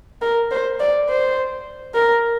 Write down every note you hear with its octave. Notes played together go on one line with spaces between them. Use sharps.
A#4
C5
D5
C5
A#4